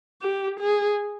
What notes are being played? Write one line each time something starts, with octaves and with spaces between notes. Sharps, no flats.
G4
G#4